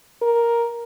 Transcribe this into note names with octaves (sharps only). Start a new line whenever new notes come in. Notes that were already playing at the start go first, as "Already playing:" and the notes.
A#4